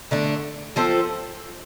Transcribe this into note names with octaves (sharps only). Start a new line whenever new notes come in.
D3 A3 D4
F3 C4 F4 A4